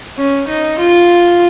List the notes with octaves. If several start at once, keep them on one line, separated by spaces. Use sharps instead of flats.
C#4
D#4
F4